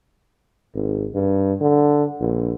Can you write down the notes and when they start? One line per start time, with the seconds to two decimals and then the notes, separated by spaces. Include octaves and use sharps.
0.75 G#1
1.14 G2
1.61 D3
2.21 A#1